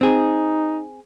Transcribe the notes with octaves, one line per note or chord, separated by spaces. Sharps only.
C4 D#4 G#4